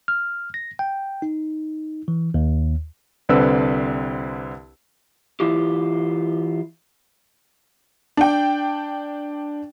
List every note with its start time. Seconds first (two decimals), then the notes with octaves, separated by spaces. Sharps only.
0.08 F6
0.54 A#6
0.79 G5
1.22 D#4
2.08 E3
2.34 D#2
3.29 C2 D3 C4 B4 E6
5.40 E3 E4 F4 G4
8.17 D4 G5